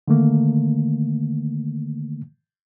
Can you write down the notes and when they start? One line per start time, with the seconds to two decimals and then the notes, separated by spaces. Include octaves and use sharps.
0.08 D3 D#3 A3 A#3